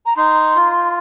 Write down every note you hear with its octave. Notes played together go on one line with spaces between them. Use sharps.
A#5
D#4 C6
F4